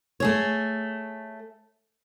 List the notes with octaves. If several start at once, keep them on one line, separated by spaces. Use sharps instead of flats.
A3 G#4 C#5